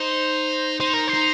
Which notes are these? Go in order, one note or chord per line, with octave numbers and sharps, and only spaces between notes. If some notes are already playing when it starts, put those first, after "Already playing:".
Already playing: D#4 C5
D#4 C5
A#4
C5
D#4